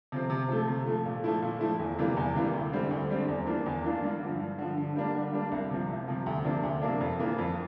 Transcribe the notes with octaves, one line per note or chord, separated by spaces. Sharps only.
C3 F3 C4
C3
F3 A3
C3
F3 A3
A#2
F3 A3 E4
A#2
F3 A3 E4
E2
C3 E3 G3 A#3
E2
C3 E3 G3 A#3
D2
D3 G3 C4
D2
D3 G3 C4
E2
E3 A#3 D4 F4
E2
E3 A#3 D4 F4
G2
D3
F3
G2
D3 F3
D3
G3 A#3 D4
D3
G3 A#3 D4
C2
C3 F3
C2
C3 F3
D2
C3 F3 A#3 D4
D2
C3 F3 A#3 D4
F2
E3 A#3 F4
F2